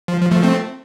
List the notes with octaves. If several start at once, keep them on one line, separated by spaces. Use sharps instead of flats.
F3
F3
F3 A3
A3 C4